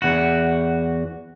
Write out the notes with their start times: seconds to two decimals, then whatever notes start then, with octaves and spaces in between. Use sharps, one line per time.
0.02 E2 F#4